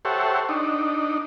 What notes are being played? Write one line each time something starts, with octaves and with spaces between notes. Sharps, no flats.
G4 A4 C5 C#5 E5 F#5
D4 D#4